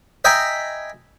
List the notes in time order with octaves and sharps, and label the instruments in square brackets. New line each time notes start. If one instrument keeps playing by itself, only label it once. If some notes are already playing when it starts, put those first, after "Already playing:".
[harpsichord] D#5 E5 G5 G#5 A#5 B5